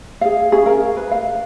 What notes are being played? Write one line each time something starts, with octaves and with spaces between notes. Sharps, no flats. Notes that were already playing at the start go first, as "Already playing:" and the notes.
G#4 F5
C#4 G#4
A#4 F5
B4
F5